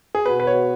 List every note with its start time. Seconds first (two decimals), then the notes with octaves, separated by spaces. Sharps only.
0.15 G#4
0.25 B2 B3 F#4 B4
0.40 B4
0.47 C#5